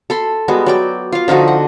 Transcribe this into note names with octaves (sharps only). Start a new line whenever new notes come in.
A4 B5 C6
G3 G#3 B3 F#4
F#3 D5 G5
F4 F5
D3 F3 D#4 F#4
F#5